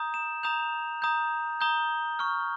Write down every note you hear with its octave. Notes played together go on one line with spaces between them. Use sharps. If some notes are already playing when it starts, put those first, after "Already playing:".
Already playing: A#5 D#6 G6
E7
A#5 D#6 G6 F7
A#5 D#6 G6
A#5 D#6 G6 G7
C#6 F6